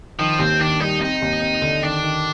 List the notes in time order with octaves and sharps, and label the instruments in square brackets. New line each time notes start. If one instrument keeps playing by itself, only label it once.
[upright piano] D#3 [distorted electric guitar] F3
[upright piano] D#2 [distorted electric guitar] C4
[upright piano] D#3 [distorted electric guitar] D4
[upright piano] G3 [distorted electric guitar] D#4
[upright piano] C4 [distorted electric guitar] D#4
[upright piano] D#2
C4
D3
[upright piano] D#3 [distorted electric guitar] D4
[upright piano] D#3